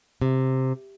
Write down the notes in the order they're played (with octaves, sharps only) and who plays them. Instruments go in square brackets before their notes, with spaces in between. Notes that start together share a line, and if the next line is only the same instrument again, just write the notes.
[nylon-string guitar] C3